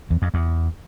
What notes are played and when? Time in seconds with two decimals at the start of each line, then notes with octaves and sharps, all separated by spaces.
0.10 E2
0.22 F2
0.34 E2